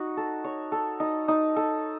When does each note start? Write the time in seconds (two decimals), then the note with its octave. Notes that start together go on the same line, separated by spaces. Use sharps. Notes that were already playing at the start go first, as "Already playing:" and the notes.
Already playing: D#4 F#4
0.17 A4
0.44 C#5
0.72 A4
1.00 D#4
1.28 D#4
1.56 A4